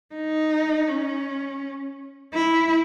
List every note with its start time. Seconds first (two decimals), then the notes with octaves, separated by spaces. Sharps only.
0.15 D#4
0.88 C#4
2.34 E4